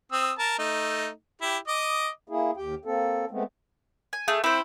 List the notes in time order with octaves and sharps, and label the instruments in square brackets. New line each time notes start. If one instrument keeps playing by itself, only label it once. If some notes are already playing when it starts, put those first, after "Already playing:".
[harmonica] C4 D#6 E6
A#4 A5
A3 D#4
E4 G4
D#5 D6 D#6
[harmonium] A#3 E4 G#4
D#2 G4 G5
A#3 C4 A4
G#3 A3 B3 C4
[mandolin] G#5
[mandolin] A3 [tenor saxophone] G#4
[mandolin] C4 C5 [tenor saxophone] E4